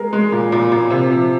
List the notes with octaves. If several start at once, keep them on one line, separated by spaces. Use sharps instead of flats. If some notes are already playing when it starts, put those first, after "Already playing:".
Already playing: G#3 A#4
G#3
A#2
A#2
A#2
C3
F3